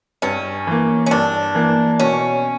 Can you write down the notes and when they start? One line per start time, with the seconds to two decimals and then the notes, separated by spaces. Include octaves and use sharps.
0.22 G2 C#4
0.67 E3 A#3
1.06 C#4
1.11 G2 D4
1.55 E3 A#3
1.99 B2 C#4